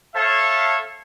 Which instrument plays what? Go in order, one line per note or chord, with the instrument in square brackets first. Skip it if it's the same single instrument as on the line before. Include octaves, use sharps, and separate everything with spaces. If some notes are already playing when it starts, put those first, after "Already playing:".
[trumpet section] A4 C#5 E5 F5 A5